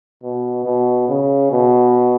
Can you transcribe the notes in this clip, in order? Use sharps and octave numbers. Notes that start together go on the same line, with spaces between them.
B2
B2
C#3
B2